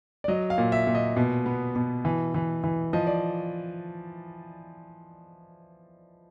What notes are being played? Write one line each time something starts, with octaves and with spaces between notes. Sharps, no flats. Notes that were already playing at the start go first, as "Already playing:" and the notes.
D5
F#3 D#5
F5
A#2
E5
A#2
D#5
B2
B3
B2
E3
E3
E3
F3 D#5
D5